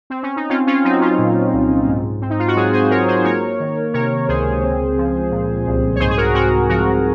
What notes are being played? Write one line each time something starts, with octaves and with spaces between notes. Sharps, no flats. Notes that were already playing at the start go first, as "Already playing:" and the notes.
C4
C#4
D#4
C4 C#4 F4
C#4 F4
F#3 C4 D#4
C#4 F4
A#2
C2
G#2
C4
D#4
F4
F#4
F#3 F4 G#4
G#4 C5
G#2 A#4 C#5
G#4 C5
A#3 A#4 C#5
D#3
C3 A#4 C#5
C#2 G#4 C5
C4
F3
A#2
C2
C#5
G#2 G#4 C5
G#4
F#4 A#4
C4 F#4 A#4
F3 F#4 A#4